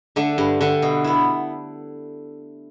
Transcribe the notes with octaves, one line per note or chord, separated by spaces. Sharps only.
D3 A3 D4
G2
D3 A3 D4
B2
B3 E4